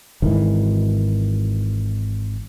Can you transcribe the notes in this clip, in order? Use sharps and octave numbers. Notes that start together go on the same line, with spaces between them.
G#1 G#2 D#3 E3